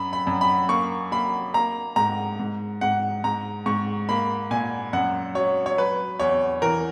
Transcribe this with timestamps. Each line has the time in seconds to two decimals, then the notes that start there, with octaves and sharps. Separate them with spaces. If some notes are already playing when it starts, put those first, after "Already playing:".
Already playing: F#2 B5
0.13 B5
0.27 F#2
0.41 B5
0.69 A#3 C#6
1.12 A#3 B5
1.54 A#3 A#5
1.96 G#2 A#5
2.39 G#2
2.81 G#2 F#5
3.24 G#2 A#5
3.66 G#2 C#6
4.09 A#3 B5
4.51 A#2 G#5
4.93 F#2 F#5
5.35 F#3 C#5
5.66 C#5
5.78 F#3 B4
6.19 E2 C#5
6.62 E3 A#4